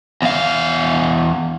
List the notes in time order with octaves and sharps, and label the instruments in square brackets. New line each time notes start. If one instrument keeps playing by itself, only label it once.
[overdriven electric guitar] E2 F5